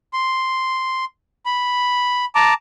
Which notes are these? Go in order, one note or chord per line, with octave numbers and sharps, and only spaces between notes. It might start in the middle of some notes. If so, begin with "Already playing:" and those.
C6
B5
A5 A#5 D6